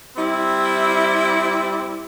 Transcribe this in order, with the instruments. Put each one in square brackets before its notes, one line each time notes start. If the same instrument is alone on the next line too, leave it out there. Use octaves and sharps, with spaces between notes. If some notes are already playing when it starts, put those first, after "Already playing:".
[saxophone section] G3 C4 E4